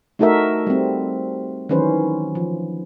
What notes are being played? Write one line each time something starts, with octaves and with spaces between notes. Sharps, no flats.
A3 D#4 F#4 A4 A#4 E5
G3 C4
D#3 E3 F#3 C#4 B4 C5
F3